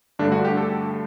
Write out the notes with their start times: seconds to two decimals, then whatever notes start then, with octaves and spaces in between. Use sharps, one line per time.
0.19 G2 D3 A3 D4
0.32 F#4
0.45 G4
0.57 A4